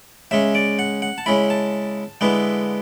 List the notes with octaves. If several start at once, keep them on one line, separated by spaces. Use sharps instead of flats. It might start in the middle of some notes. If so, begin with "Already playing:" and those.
C#3 G#3 C#4 E5
D5
F#5
F#5
A5
C#3 G#3 C#4 E4 B5
A5
D3 G#3 B3 E4